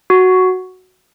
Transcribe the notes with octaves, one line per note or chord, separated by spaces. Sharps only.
F#4